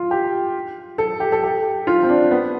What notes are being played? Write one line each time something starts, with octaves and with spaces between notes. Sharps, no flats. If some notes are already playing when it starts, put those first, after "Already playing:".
Already playing: F4
G4
A4
G4
A4
G4
F4
C4
D4
B3